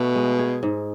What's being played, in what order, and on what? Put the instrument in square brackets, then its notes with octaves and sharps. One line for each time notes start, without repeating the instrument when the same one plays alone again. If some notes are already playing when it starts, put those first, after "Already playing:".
Already playing: [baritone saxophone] B2 [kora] A3
[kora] G#3
G#4
G#2